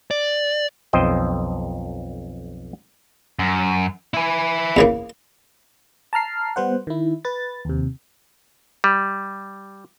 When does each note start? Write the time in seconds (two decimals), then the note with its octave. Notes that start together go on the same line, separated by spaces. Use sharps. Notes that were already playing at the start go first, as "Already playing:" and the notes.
0.11 D5
0.93 B1 F2 C5 D#5 G5
3.39 F#2
4.14 E4 G#5
4.77 E2 C#3 A#3
6.13 A5 A#5 F6 C7
6.56 G3 B3 C5 F#5
6.87 D#3 E4
7.25 B4 A6
7.65 D#2 C3
8.84 G3